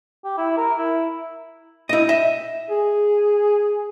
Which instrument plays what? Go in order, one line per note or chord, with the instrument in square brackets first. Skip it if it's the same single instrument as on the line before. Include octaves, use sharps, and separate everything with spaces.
[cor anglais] G4
E4
A#4
E4
[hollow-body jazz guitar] E4 D#5
D#5 E5
[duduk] G#4